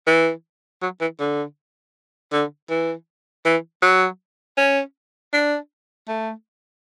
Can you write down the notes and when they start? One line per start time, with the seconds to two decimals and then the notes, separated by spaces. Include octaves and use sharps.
0.07 E3
0.82 F#3
1.01 E3
1.19 D3
2.32 D3
2.70 E3
3.45 E3
3.82 F#3
4.57 C#4
5.33 D4
6.08 A3